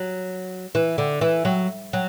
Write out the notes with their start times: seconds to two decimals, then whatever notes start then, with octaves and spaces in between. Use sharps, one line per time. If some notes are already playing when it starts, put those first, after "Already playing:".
Already playing: F#3
0.75 E3
0.98 D3
1.21 E3
1.45 F#3
1.93 F#3